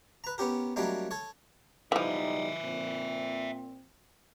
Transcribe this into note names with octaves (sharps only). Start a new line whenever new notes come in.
B4 A#5
B3 C#4 G4 A#4
F#3 G3 A3 A#3 C#4 D#4
A4 C#5
B1 E3 F3 G3 D#4 E5 G#5
A#2 C4